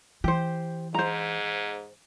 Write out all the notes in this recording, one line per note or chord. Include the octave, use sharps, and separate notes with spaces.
E3 G4 C5
G#2 C5 A#5